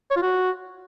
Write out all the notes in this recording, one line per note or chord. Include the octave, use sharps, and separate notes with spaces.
C#5
F4
F#4